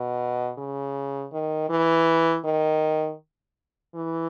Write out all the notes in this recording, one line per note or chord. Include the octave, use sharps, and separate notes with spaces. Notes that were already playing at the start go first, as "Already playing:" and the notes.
Already playing: B2
C#3
D#3
E3
D#3
E3